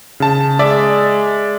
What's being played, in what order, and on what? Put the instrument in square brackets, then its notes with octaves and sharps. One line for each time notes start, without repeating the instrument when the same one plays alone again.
[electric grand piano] C#3 A5
[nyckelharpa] G#3 [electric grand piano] D5 E5 A6